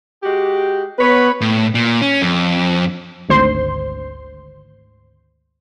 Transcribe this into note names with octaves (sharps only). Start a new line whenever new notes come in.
G#3 F#4 G4
B3 B4 C#5 B5
A2
A#2
C#4
F2
G#1 D2 C5 C6